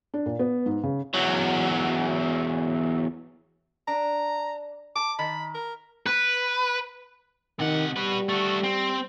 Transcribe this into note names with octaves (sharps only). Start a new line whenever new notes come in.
D4
A#2
B3
G#2
C#3
E2 F#3
D4 A#5
A5 D6
D#3 B5
A#4
B4
C3 D#3 F#5
G3 F#4 B4
A3 F#4
C4